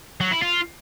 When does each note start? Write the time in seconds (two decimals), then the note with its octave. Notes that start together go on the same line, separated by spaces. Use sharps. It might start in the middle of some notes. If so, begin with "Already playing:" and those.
0.21 F#3
0.31 E4
0.42 F4